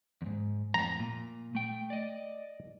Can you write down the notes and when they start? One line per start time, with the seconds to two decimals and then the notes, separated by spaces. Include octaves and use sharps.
0.22 E2 G#2
0.74 F2 A2 A#5
1.00 A#2
1.55 A3 G5
1.90 D5 D#5